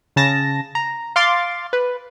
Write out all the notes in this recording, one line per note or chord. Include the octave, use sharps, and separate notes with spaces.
C#3 A5 A#6
A#5
F5 C6 D6 A6
B4